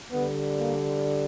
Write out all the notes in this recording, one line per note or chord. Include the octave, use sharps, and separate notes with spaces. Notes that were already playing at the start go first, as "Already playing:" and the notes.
D3 G3 B3
A#3